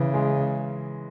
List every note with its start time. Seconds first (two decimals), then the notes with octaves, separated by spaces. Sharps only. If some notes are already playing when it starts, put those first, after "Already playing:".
Already playing: C#3 E3
0.14 G#3